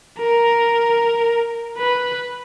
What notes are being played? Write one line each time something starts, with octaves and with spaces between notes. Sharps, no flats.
A#4
B4